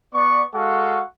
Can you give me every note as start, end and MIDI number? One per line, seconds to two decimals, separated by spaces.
0.14 0.42 59
0.14 0.42 74
0.14 0.42 85
0.54 1.01 56
0.54 1.01 66
0.54 1.01 69
0.54 1.01 77
0.54 1.01 78
0.54 1.01 85